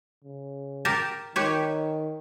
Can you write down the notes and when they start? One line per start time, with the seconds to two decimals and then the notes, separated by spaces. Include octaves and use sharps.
0.24 C#3
0.85 G4 A#4 A5
1.36 D#3 G4 B4 C#5